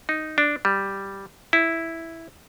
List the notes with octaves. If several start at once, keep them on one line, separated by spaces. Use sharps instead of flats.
D#4
D4
G3
E4